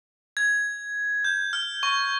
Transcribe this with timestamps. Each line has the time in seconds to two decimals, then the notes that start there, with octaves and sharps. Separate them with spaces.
0.37 G#6
1.24 G6
1.53 F6
1.83 C#6